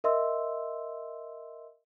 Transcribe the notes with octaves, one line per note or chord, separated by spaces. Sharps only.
A#4 D#5 E5 C6 E6